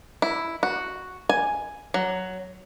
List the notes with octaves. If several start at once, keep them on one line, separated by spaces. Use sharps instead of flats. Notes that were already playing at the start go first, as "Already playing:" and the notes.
E4
F#4
G#5
F#3